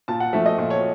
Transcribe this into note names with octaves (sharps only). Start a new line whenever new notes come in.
A#2 A5
F#5
F3 A3 E5
D#5
A#2
C#5